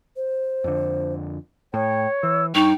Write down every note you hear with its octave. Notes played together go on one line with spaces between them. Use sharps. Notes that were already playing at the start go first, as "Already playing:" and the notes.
C5
F2 D3
A2 C#5 G5
E3 E6
G2 D#4 G5 C#6